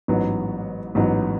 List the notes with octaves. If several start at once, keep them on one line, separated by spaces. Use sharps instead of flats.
A1 G#2 F#3 B3
A1 G#2 F#3 B3